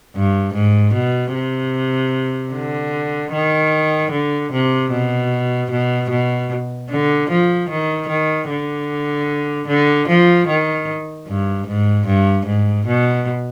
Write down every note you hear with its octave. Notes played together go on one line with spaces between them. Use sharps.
G2
G#2
B2
C3
D3
D#3
D3
C3
B2
B2
B2
D3
F3
D#3
D#3
D3
D3
F3
D#3
G2
G#2
G2
G#2
B2